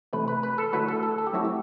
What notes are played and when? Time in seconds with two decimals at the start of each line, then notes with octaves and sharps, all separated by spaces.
0.13 C3 E3 A3 B4
0.28 B4
0.43 B4
0.58 A4
0.73 D3 F#3 A3 E4 B4
0.88 A4
1.03 A4
1.18 A4
1.27 G4
1.33 F#3 A3 C4 E4 F#4
1.45 G4